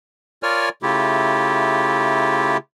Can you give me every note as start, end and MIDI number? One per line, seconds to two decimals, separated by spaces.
0.43 0.69 65
0.43 0.69 70
0.43 0.69 73
0.43 0.69 74
0.43 0.69 80
0.43 0.69 89
0.83 2.57 49
0.83 2.57 57
0.83 2.57 64
0.83 2.57 65
0.83 2.57 67